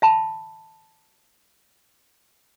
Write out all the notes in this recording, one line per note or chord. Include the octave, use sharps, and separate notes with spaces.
E5 A5 B5